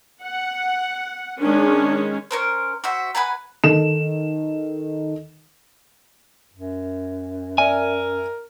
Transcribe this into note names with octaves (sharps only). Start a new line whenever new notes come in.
F#5
D#3 G#3 C#4 D4
C#4 A#4 C5
F#4 C5 E5
B4 F#5 G#5 A#5
D#3 A4 E7
F#2
A#4 D5 E5 G#5